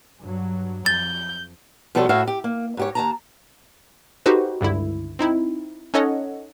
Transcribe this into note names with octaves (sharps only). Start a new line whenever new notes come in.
G2 F#3
F2 G6 A6
B2 F3 G3 A4 C5 C#5
A2 F#4 C#5 E5 F5
G4
A#3
G#2 G4 C#5
D#2 A5 A#5
D#4 F#4 G4 A4 B4 C5
C#2 G2 D3 E4
C4 D#4 E4
C#4 D#4 A4 C#5 D#5 F#5